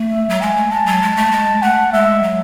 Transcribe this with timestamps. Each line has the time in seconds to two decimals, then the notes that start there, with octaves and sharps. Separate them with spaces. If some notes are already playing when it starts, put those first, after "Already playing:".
Already playing: A3
0.11 E5
0.30 F#3
0.41 G#3 G#5
0.57 A3
0.71 G#3 A5
0.86 F#3
1.02 G#3
1.17 A3
1.32 G#3
1.62 A3 F#5
1.93 G#3 E5
2.23 F#3